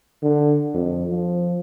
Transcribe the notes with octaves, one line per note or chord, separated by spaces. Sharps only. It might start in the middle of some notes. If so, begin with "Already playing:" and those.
D3
F2
F3